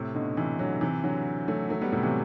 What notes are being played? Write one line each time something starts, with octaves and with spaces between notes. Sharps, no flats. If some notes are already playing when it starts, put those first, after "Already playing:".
Already playing: A2 C3
B2 D3
C3 E3
D3 F#3
C3 E3
D3 F#3
F#3 A3
F#3 A3
G3 B3
A2 C3
C3 E3